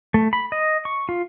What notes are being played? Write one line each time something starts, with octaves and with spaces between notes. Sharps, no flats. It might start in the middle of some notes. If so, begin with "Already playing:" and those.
A3
B5
D#5
C#6
F4